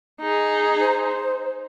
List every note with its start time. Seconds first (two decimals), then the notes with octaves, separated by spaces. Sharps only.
0.21 D#4 G#4
0.80 C5